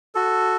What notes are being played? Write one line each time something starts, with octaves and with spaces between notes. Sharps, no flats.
F#4 A4